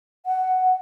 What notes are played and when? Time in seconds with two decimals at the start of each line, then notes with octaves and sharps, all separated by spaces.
0.26 F#5